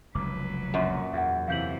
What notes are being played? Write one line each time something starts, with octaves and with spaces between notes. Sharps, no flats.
F1 C#2 F#3 B4 D6
F#2 A#2
E2 E5 F#5
C3 E3 F5 G6 F#7